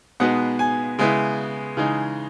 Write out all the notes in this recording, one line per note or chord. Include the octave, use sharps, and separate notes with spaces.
B2 G#3 B3 D#4 F#5
G#5
C#3 G#3 B3 E4
C#3 E3 G#3 D#4